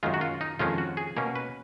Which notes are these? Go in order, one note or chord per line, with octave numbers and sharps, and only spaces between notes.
F#2 D#3 G#3 F4
F#4
F4
D#4
F2 D#3 G#3 C#4 F4
F#4
G#4
B2 A#3 C#4 A#4
B4